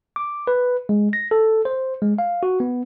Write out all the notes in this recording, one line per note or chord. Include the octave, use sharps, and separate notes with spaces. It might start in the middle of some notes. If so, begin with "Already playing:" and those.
D6
B4
G#3
A#6
A4
C5
G#3
F5
F#4
B3